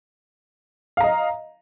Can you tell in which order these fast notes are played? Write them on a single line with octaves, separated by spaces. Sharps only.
F5 A#5 D#5